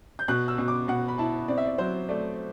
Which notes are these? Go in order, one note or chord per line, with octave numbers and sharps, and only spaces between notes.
G6
B2 F#6
E6
B2
D6
B2 F#5
B5
E4 A5
C4 D5
E5
D5
F#3 C5
A3 D5